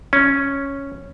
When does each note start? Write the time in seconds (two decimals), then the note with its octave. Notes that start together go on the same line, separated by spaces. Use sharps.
0.13 C#4